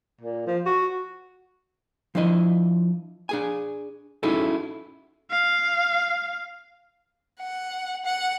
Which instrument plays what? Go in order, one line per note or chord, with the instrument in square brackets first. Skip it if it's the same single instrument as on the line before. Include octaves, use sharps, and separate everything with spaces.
[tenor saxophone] A#2
F3
F#4
[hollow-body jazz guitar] F3 D4 E4 D#5
D4 G#4 G#5
C#4 D#4 E4 F#4 G#4 A4
[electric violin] F5
[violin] F#5
F#5